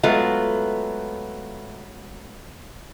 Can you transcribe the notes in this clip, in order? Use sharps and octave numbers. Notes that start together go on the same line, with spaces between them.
F#3 G#3 A3 B3 F4